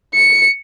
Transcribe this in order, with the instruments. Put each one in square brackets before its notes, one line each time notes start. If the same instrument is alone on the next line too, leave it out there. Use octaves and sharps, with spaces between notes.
[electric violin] C#7